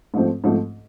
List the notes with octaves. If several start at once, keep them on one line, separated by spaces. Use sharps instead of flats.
G#2 F3 A3 C4
G#2 F3 A3 C4